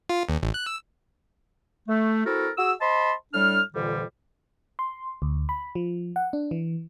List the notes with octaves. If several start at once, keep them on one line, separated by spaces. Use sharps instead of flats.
F4
D#2
A1
F#6
E6
A3
C4 E4 F#4 A4 A#4
F#4 G#4 E6
C5 D#5 A5 B5 C6
A2 G3 D4 F6
F2 A#2 D3 E3 G3
C6
D2
B5
F3
F#5
D4
E3